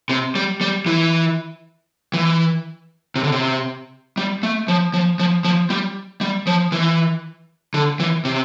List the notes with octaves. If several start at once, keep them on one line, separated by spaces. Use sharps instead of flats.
C3
G3
G3
E3
E3
C3
D3
C3
G3
A3
F3
F3
F3
F3
G3
G3
F3
E3
D3
E3
C3